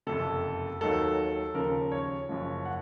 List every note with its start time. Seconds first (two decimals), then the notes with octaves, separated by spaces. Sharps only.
0.07 F#1 F2 C3 A4
0.81 D#2 D#3 F#3 A4
1.55 D#2 C#3 F3 A#4
1.92 C#5
2.29 F#1 F#2 F3
2.65 F#5